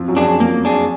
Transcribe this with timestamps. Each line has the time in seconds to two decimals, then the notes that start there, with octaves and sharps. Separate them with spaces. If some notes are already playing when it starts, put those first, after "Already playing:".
Already playing: F2 F3
0.08 F#2 F#3
0.17 D4 G#4
0.24 F2 F3
0.40 F2 F3 A#3
0.65 D4 G#4